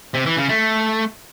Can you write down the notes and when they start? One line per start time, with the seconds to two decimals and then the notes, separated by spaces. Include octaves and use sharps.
0.14 C3
0.26 E3
0.37 C#3
0.49 A3